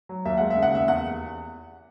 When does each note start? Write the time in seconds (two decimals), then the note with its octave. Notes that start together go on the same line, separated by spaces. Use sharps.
0.09 F#3
0.25 D#2 E5
0.38 G#3 F#5
0.50 E5
0.57 C#3
0.63 F#5
0.73 D#2 E5
0.88 E2 F#5